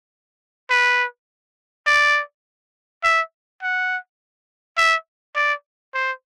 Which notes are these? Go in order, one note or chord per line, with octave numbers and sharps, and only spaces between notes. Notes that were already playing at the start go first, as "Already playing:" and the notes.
B4
D5
E5
F#5
E5
D5
C5